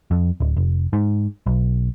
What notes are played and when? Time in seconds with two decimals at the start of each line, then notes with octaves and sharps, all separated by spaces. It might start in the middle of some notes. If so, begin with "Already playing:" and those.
0.11 F2
0.40 D1
0.57 F1
0.93 G#2
1.46 B1